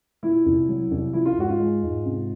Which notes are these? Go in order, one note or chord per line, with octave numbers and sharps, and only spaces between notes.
A#2 E4
C2
F#3
C2
F3 E4
F4
G#2 F#4
F4
G#3
G#2
C3